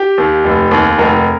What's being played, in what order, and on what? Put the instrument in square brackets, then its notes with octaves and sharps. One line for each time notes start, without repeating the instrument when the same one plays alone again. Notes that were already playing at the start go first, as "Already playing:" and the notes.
Already playing: [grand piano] G4
D#2
F1
D#2
F1 A#4